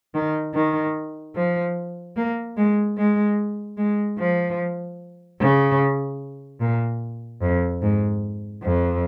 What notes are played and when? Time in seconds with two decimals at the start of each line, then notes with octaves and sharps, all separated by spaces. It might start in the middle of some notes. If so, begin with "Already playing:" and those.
0.14 D#3
0.54 D#3
1.35 F3
2.16 A#3
2.57 G#3
2.97 G#3
3.77 G#3
4.18 F3
5.40 C#3
6.61 A#2
7.42 F2
7.82 G#2
8.63 F2